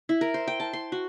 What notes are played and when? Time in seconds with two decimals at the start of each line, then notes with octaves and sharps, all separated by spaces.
0.09 E4
0.21 A#4
0.34 C5
0.47 G5
0.60 A5
0.73 C6
0.92 F#4